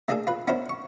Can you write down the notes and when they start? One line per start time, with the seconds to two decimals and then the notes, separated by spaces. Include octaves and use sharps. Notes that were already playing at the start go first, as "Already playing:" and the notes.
0.08 A3 A#3 D4 G#4 A4
0.27 F4 B4
0.48 B3 C#4 D4 E4 A#4 C5
0.69 C#6